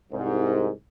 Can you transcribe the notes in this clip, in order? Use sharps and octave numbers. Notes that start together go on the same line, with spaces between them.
C2 G#2